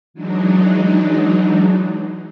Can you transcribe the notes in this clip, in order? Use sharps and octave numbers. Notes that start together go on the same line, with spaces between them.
E3 F#3 G#3 D4 D#4